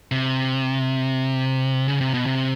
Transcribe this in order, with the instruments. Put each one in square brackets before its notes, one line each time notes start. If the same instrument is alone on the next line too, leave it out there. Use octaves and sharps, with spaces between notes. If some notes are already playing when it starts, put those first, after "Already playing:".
[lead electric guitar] C3
C#3
C3
B2
C3